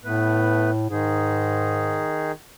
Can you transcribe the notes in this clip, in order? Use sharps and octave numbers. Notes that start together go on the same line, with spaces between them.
A2 A3 B3 B4
G#2 D#3 D#4 G#4